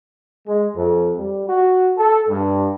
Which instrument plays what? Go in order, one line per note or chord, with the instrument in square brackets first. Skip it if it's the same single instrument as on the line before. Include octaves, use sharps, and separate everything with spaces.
[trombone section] G#3
F2
G3
F#4
A4
G2